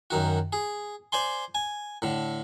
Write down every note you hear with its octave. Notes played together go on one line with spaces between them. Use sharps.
F#2 D#3 F#4
G#4
C5 D5 G#5 C6
G#5
A2 D3